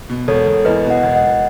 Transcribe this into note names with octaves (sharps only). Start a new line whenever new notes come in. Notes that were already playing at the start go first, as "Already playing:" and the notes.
B2
E1 A4 C#5
E1
E2 B4 D#5
B2
D#5 F#5
E1
D#5 F#5
E1